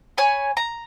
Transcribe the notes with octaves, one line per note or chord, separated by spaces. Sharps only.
C#5 G#5 B5
A#5